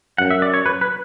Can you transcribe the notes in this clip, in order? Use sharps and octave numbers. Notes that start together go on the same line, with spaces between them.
F#2 F#5
E5
D5
C#5
B4
B4